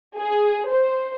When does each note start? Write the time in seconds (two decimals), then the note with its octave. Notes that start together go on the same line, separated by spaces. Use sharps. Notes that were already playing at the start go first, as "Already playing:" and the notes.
0.17 G#4
0.71 C5